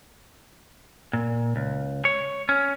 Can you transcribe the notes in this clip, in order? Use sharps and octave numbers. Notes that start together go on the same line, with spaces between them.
A#2
C#2
C#5
C#4